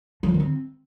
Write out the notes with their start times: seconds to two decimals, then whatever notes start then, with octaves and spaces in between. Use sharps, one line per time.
0.23 F3
0.29 C4
0.34 D#3
0.40 C4